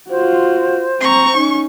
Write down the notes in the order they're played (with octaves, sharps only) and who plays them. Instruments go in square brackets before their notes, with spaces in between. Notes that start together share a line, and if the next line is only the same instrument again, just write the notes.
[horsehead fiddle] F4 F#4 [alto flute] C5
[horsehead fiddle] C4 A#5 [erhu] C#6
[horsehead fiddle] C#4 D#4